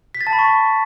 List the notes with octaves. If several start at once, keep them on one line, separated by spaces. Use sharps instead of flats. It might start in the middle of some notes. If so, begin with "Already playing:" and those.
B6
A6
A5
B5
C#6